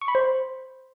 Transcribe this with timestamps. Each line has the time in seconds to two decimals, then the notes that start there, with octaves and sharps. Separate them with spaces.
0.01 C#6
0.08 B5
0.15 C5